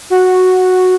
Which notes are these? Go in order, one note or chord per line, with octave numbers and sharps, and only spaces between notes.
F#4